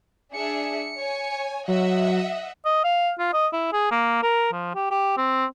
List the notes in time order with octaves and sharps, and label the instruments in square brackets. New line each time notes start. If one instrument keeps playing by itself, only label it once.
[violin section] D4 G#4 E5 [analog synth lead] C#7
[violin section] C#5 G#5
[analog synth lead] F#3 [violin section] D#5 E5 F#5
[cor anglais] D#5
F5
F4
D#5
E4
G#4
A#3
A#4
F3
G4
G4
C4